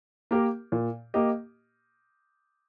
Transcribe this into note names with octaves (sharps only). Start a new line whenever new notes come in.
A#3 G4 A#4
A#2
A#3 G4 D#5